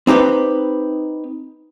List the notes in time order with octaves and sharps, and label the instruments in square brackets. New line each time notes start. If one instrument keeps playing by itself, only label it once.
[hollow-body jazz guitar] C4 D#4 G4 B4